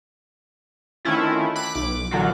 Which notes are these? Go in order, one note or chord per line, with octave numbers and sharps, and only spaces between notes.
D#3 A3 C4 C#4 E4 F4
B5 D6 F#6
B1 D6
A#2 D3 E3 F#3 F4 F#4